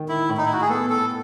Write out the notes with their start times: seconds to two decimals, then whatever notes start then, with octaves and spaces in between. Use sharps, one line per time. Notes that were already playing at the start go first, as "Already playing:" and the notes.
Already playing: D#3
0.09 E4
0.29 A2
0.37 D#4
0.45 E4
0.53 F#4
0.61 G#4
0.69 B3 A4
0.90 A4